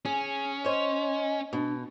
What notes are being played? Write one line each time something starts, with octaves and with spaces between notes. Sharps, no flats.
C#4 G#4
C5 C#5 D#5
B2 D4